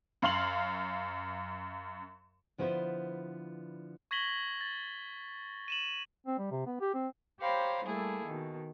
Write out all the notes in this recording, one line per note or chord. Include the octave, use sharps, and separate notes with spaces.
F#2 F5 C6 F#7
D3 F3 B3 E4 B4 C5
C#6 G#6 A#6 B6 F#7 G7
A6
D#7 E7 F#7
C4
G3
C3
B3
G4
C4
G4 C5 C#5 F5 A#5 B5
G3 A3 A#3 E4 G#4 A4
B2 D#3